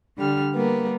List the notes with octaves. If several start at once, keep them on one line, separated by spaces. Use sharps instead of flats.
D3 G3 F6
G3 A#3 B3 A#4